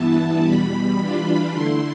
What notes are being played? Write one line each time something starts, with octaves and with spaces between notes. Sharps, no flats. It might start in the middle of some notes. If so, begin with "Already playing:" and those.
Already playing: G2 E3 B3 E4 A5
E2 B2 G3 B5
E3 G3 D4 F4
D3 A3 E4 C6